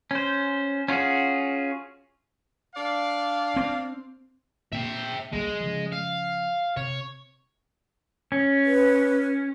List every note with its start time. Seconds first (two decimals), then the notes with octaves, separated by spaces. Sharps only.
0.11 C#4 C5
0.88 C#4 F4 F#4 G#4
2.74 D4 D5 F5
3.56 C4
4.72 A#2 A#3 C4 E5 G5
5.33 C#2 G3 G#3 A#3
5.60 C#3 F3
5.92 F5
6.77 C3 C#5
8.32 C#4
8.66 B4